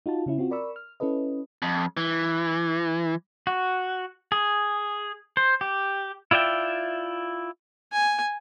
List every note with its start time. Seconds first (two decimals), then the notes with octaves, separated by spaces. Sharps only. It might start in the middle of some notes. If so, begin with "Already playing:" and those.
0.06 D#4 F4 F#4 A5
0.26 C#3 C#4 E4
0.38 C4 F4 F#4
0.51 A#4 D5 B5 C#6 E6
0.76 F6
1.00 C#4 E4 A4 B4 D#5
1.62 F2
1.97 E3
3.47 F#4
4.32 G#4
5.37 C5
5.61 G4
6.31 E4 F4 D5 E5 G5
7.92 G#5